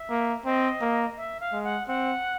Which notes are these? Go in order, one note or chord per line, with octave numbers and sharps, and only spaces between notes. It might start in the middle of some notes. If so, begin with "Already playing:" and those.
Already playing: E5
A#3
C4 D#5
A#3
E5
F5
G#3
F#5
C4 F#5